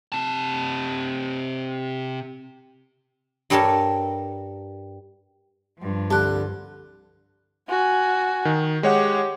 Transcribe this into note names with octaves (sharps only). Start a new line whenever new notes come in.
C3 A5
G2 G3 A4 A#4 C#5 A5
G2 F3
C2 D3 G4 A5 F#6
F#4 G#5
D#3
G#3 G4 C#5 F#5